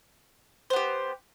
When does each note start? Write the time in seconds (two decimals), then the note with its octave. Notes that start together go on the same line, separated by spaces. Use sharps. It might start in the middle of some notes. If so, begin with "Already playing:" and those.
0.70 C5
0.73 B3
0.76 G4